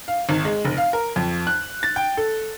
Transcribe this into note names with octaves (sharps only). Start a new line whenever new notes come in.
F5
G#1
G#3
F1
F5
A#4
F2
F#6
A6
G5
A4